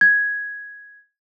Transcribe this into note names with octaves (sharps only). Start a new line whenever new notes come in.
G#6